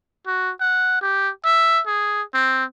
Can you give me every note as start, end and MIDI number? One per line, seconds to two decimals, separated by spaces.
0.27 0.52 66
0.60 0.98 78
1.02 1.30 67
1.45 1.81 76
1.86 2.22 68
2.34 2.64 60